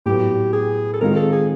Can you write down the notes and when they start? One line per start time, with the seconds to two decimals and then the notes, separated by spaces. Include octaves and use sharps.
0.06 A2 F#3 B3 G4
0.53 G#4
0.93 A4
1.01 D#3 G#3 C4 F4 A#4
1.16 A4
1.33 G#4